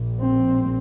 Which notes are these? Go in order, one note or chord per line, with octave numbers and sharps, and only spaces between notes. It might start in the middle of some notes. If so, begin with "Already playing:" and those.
Already playing: A#1 A#2
C4